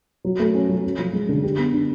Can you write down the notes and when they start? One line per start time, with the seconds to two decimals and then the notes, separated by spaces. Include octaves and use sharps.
0.25 F#3
0.40 A3
0.55 C#4
0.69 F#3
0.84 C#4
0.98 F3
1.13 G#3
1.29 D3
1.43 G4
1.58 B3
1.74 D4